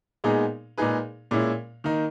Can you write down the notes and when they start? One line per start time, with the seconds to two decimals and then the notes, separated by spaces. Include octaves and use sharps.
0.24 A#2 G#3 B3 D#4 G#4
0.78 A#2 G#3 D#4 G#4 B4
1.31 A#2 G#3 C#4 E4
1.84 D#3 A#3 D#4